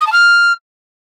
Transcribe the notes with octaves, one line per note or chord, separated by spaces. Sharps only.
D#6
A5
F6